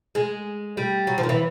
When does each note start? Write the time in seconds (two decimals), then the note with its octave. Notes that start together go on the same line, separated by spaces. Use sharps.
0.15 G#3
0.77 G3
1.07 F#3
1.18 F3
1.23 D#3
1.29 E3